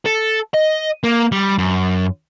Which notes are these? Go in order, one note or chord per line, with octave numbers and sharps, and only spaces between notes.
A4
D#5
A#3
G3
F#2